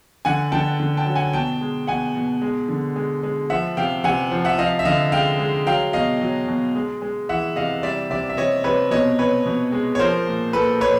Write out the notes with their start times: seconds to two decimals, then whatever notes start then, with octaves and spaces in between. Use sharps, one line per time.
0.25 D3 F#5 G#5
0.52 D3 G5 A5
0.80 D3
0.97 G5 A5
1.06 F#3
1.16 F#5 G#5
1.33 B2 G5 A5
1.61 G#3
1.87 B2 F#5 G#5
2.15 B2
2.42 G#3
2.69 D3
2.96 G#3
3.23 G#3
3.50 F3 E5 F#5
3.77 C3 F5 G5
4.04 C3 F#5 G#5
4.31 F3
4.45 E5 F#5
4.58 F3 D#5 F5
4.79 E5
4.85 D3 D#5 F5
5.12 G#3 F5 G5
5.39 G#3
5.66 F#3 F5 G5
5.93 B2 D#5 F5
6.21 F#3
6.48 B2
6.76 G#3
7.02 G#3
7.29 E3 E5 F#5
7.56 C3 D#5 F5
7.83 G3 D5 E5
8.10 C3 D5 E5
8.29 E5
8.37 C3 C#5 D#5
8.64 C3 B4 C#5
8.91 B2 C#5 D#5
9.19 B2 B4 C#5
9.46 B2
9.72 G#3
9.95 C#5
9.99 F3 A#4 C5
10.27 A#2
10.53 A#2 A4 B4
10.80 A#2 B4 C#5